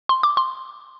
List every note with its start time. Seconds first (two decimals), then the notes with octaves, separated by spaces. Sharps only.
0.09 C6
0.23 D6
0.37 C6